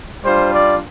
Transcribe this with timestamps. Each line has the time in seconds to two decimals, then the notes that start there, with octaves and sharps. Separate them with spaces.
0.24 G3 D4 F4 C5
0.54 D5